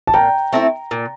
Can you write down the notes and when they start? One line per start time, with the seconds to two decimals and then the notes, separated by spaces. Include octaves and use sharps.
0.07 A5
0.14 A#2 G5 A#5
0.53 A3 C4 E4
0.91 A#2